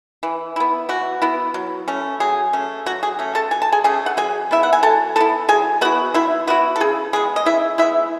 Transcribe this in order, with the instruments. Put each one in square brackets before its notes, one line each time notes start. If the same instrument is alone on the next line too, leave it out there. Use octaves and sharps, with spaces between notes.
[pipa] E3
B3 E4
E3 F#4
B3 E4
F#3
A3 C#4
F#3 G#4
A3 C#4
F#3 F#4
G#4
A3 C#4
A4 A5
F#3 G#5
A5
G#4 G#5
A3 C#4 G#4 G#5
F#5
F#3 G#4 G#5
B3 E4 E5
F#5
G#5
F#3 A4 A5
B3 E4 A4 A5
F#3 G#4 G#5
B3 E4 F#4 F#5
F#3 E4 E5
B3 E4 F#4
A4
C#3 G#4
G#3 B3 G#4
D#5
C#3 E4 E5
G#3 B3 E4 E5